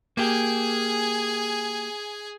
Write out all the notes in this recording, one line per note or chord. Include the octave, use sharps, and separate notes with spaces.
A#3 G4 G#4 G#5